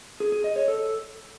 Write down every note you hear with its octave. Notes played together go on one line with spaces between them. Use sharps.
G#4
G#4
D#5
C#5
A4